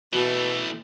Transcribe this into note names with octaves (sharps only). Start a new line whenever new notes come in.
B2 E3 A3